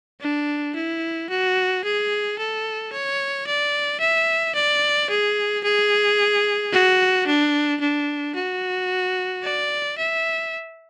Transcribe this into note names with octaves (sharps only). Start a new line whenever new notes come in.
D4
E4
F#4
G#4
A4
C#5
D5
E5
D5
G#4
G#4
F#4
D4
D4
F#4
D5
E5